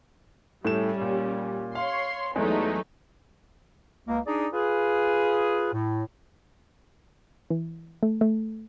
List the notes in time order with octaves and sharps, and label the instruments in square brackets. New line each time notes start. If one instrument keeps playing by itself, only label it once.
[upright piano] A2 A3 E7 [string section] G3 C#4
[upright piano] A#2
[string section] C#5 C6 [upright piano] F5
[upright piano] E2 G#3 [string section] F#3 A3 D#4
[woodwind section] C#2 A#3
D4 D#4 G#4 D5
F4 G#4 B4
A2
[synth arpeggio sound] E3
A3
A3